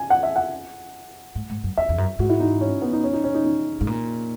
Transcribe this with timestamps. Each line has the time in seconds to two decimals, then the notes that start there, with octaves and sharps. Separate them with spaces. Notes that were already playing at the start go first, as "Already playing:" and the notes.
Already playing: G#5
0.10 F#5
0.23 E5
0.36 F#5
1.35 G#2
1.50 G#2
1.64 F#2
1.77 E2 E5
1.89 E2
1.98 F#2
2.19 G#2 F#4
2.29 E4
2.40 D#4
2.61 C#4
2.82 B3
2.93 D#4
3.03 C#4
3.13 D#4
3.24 C#4
3.34 D#4
3.45 D#4
3.81 G#2
3.87 A#2